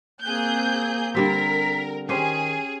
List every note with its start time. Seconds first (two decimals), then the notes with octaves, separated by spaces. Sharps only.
0.22 A#3 C4 G#4 F#6 G6
1.15 D3 G3 C4 A#4 B6
2.09 D#3 C#4 G4 G#4 C5 D#7